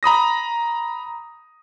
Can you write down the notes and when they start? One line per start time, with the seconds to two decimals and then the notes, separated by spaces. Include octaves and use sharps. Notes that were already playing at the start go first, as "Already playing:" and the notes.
0.03 A#5 B5 D#6 A#6